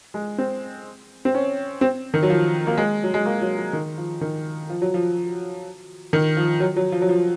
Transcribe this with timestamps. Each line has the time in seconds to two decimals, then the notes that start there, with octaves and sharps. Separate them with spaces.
0.14 G#3
0.38 C4
1.25 C4
1.34 C#4
1.81 C4
2.14 D#3
2.23 F#3
2.30 F3
2.67 A#3
2.78 G#3
3.03 F#3
3.14 G#3
3.26 A#3
3.42 F#3
3.58 F#3
3.73 D#3
3.98 F3
4.21 D#3
4.70 F3
4.82 F#3
4.94 F3
6.13 D#3
6.37 F3
6.60 F#3
6.77 F#3
6.92 F3
7.02 F#3
7.09 F3